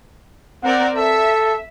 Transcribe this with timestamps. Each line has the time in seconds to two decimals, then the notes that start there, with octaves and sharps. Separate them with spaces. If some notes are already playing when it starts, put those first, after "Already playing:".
0.63 C4 A#4 D5 F#5
0.96 A4 E5